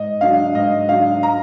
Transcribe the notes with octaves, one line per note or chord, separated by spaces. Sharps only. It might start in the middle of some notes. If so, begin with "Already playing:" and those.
Already playing: G#2 D#5
F#3 D4 F5
G#2 D#5
F#3 D4 F5
A#5